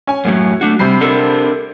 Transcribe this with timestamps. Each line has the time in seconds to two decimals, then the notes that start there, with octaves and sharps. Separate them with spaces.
0.07 C#4 G#5
0.25 F#2 A2 F#3
0.61 A3 D4 F#4
0.79 C3 G3 B5 C7
1.01 D4 A4 A#4